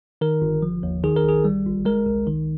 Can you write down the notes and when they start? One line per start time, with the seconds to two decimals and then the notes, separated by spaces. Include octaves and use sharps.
0.21 D#3 A#4
0.42 G1
0.62 F3
0.83 D#2
1.03 D#3 G#4
1.16 A#4
1.24 A#1 G#4
1.44 G3
1.66 G1
1.85 G#3 A#4
2.06 C2
2.27 D#3